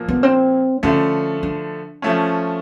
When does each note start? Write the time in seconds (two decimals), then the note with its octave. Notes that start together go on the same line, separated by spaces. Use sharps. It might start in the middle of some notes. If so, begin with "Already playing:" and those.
Already playing: A#2 F3 A#3
0.08 B3
0.23 C4
0.83 D3 F3 A3 C#4
1.43 D4
2.02 F3 A3 C#4